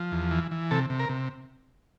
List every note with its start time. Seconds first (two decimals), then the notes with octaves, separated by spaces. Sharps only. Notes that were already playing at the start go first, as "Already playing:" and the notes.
Already playing: F3
0.12 E2
0.31 E3
0.51 E3
0.71 C3 A4
0.90 C3
1.00 A#4
1.09 C3